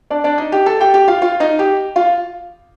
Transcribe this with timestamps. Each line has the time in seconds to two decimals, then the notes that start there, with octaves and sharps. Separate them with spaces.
0.10 D4 D5
0.24 D4 D5
0.38 D#4 D#5
0.52 G4 G5
0.66 A4 A5
0.80 G4 G5
0.94 G4 G5
1.08 F4 F5
1.22 F4 F5
1.40 D#4 D#5
1.59 G4 G5
1.96 F4 F5